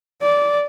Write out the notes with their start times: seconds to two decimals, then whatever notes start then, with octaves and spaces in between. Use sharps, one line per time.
0.21 D5